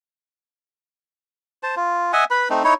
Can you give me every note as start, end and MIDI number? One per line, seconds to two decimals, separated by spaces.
1.63 1.75 72
1.63 1.75 81
1.76 2.12 65
2.13 2.24 75
2.13 2.24 76
2.13 2.24 78
2.13 2.24 80
2.31 2.49 71
2.31 2.49 83
2.50 2.63 57
2.50 2.63 60
2.50 2.63 63
2.64 2.74 63
2.64 2.74 64
2.64 2.74 73